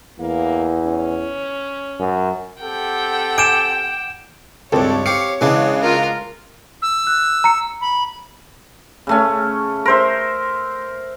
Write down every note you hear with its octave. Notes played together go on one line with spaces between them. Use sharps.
E2 A#3
C#4
F#2
C4 G4 A4 F#5 G5
G#5 D6 G6 D7 E7
C#2 G2 C4 A4 C#5
C4 G4 F5 C#7
C#3 E3 G#3 B3 D4
F4 A#4
E6
F#6
A#5 C#7
B5
C#3 A3 C#4
A#4 C5 E5